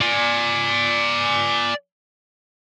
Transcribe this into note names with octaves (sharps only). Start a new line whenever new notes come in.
D5 G#5